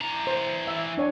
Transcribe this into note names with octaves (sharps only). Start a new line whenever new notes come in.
E3 A#5
C5
E5
D4 C#5 G#5